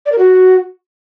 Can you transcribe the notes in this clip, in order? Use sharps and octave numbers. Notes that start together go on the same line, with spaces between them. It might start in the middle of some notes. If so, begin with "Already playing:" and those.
D5
A#4
F#4